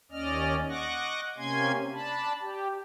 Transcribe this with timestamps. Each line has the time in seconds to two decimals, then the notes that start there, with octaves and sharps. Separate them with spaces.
0.11 D#2 C#4 D5 D#5 F6
0.69 D#5 F#5 C#6 D6 F#6 A#6
1.38 C3 A#3 C#4 G#5 C6 G#6
1.93 D4 A5 B5
2.41 G4